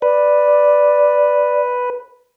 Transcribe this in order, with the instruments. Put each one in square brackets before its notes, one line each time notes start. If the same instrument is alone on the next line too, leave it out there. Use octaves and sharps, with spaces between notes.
[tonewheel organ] B4 [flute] D5